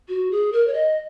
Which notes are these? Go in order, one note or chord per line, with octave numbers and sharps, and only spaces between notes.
F#4
G#4
A#4
C#5
D#5